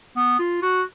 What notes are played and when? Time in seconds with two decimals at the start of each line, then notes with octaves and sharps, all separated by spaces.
0.17 B3
0.39 F4
0.62 F#4